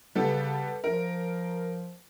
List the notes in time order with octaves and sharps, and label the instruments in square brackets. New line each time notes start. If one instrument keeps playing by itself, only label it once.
[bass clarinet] C#3 [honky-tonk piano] G3 B3 A4
[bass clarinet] F3 [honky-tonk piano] A#4